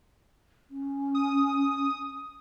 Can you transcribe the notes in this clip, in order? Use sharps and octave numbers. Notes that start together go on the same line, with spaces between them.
C#4
D#6